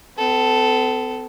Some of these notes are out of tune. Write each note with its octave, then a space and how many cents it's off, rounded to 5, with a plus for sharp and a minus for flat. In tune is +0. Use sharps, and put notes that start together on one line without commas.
B3 +45 A4 +0